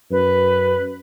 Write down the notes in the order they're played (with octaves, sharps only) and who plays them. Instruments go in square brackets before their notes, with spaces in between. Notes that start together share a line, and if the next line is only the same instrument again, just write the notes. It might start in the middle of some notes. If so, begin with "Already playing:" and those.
[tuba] F#2 [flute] B4